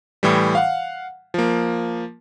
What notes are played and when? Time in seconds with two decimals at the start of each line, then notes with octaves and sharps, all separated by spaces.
0.23 A2 E3 G3
0.55 F5 F#5
1.34 F3 A#3